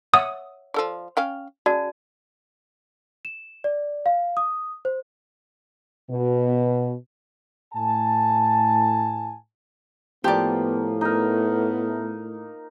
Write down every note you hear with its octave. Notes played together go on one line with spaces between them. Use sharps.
C#5 E5 F#5 D#6
F3 A4 D5
C#4 F5 G5
C#3 F#4 D5 A5
E7
D5
F5
D#6
C5
B2
A2 G#5 A5
A2 F3 A#3 B3 G4 D5
A3 B3 D#4 A#4